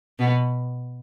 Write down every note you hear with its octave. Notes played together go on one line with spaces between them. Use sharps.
B2 B3